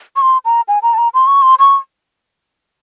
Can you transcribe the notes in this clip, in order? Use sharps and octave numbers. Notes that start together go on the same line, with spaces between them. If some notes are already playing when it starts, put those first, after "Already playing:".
C#6
C6
A#5
G#5
A#5
A5
A#5
C6
C#6
C6
C#6